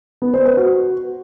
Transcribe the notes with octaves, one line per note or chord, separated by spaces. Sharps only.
B3
C5
B4
F#4